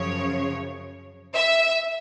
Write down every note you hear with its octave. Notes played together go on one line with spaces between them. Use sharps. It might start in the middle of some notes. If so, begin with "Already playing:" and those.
Already playing: F#2 C#3 F3 C#5
E5